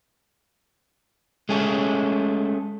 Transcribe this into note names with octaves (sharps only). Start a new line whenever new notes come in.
G#3 A3 C#4 G#4